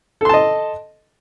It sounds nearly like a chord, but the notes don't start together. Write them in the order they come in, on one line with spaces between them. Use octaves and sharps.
A4 C6 A5 D#5